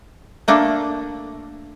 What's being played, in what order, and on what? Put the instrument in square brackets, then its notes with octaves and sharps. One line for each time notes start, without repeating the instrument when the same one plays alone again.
[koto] A3 A#3 D4 A4